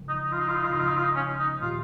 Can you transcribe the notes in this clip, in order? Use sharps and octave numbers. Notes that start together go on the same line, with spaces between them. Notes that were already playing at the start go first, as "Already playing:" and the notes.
Already playing: C#3 F3
D#4
D#4
F4
D#4
F4
D#4
F4
C#3 F3 D#4
F4
D#4
F4
D#4
C#4
D#4
A#2 D#3 F4